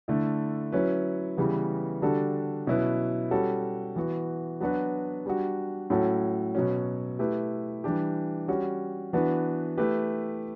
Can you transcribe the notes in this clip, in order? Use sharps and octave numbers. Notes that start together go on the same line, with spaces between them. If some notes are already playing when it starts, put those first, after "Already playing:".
D3 A3 E4
F#3 C#4 E4 B4
C#3 E3 G3 B3
D3 G3 D4 F#4 A4
B2 F#3 C#4 E4 B4
G3 C#4 F#4 A4
E3 B3 F#4
F#3 B3 D4 F#4 B4
G3 D4 F#4
A2 F#3 C#4 F#4 A4
B2 F#3 C#4
A3 E4 G4 B4
E3 G3 D4 G4
G3 C#4 F#4
E3 B3 D4 F#4 B4
A3 E4 G4 B4